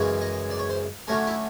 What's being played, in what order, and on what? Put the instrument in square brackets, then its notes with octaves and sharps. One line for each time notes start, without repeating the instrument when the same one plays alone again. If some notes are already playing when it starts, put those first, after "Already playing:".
Already playing: [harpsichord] F#2 C#3 E3 G#3
D#5
D5
C#5
C5
D3 F#3 A3 C#4 A#4
E4